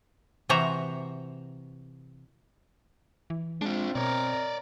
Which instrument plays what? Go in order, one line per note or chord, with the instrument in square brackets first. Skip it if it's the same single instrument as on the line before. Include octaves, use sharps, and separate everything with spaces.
[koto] C3 E3 F#4 C5 E5 A#5
[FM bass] E3
[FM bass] G#3 [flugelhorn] C4 [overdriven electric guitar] D4 F4
[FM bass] B2 [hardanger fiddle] A#4 [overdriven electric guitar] C#5 D5